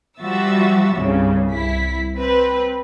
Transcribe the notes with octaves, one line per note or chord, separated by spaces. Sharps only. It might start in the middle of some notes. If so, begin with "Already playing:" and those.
F3 G3 F#4 E5 E6 A6
C2 G2 C#3
C2 E4 B6
C4 B4